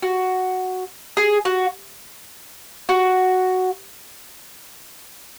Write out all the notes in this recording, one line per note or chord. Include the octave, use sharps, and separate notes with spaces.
F#4
G#4
F#4
F#4